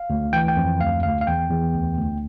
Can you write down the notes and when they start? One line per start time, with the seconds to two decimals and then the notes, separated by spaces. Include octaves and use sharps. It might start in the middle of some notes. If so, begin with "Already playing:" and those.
Already playing: F5
0.10 D2
0.33 E3 G5
0.48 G5
0.56 F2
0.81 D2 F5
1.03 D2 F5
1.21 F5
1.27 E2 G5
1.51 E2
1.74 D2
1.97 D2